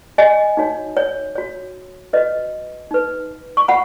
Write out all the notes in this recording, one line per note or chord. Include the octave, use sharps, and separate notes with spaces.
D#5 G#5
D#4 F#4 C#5
C#5
F#4 C#5
F#4 B4 D#5
D#4 B4
C#6
F#4 F#5 B5